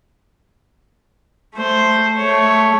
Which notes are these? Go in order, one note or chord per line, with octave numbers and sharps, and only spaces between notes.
A3 C5
A3 C#5